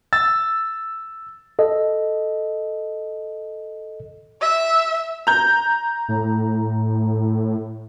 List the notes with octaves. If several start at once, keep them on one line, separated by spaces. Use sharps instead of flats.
E6 A6
A4 D#5
E5
A#5 G6
A2